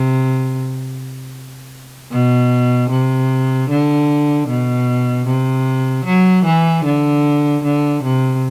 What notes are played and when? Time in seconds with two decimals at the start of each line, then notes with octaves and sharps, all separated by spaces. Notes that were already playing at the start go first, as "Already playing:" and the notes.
Already playing: C3
2.12 B2
2.90 C3
3.70 D3
4.48 B2
5.27 C3
6.05 F#3
6.45 E3
6.85 D3
7.64 D3
8.04 C3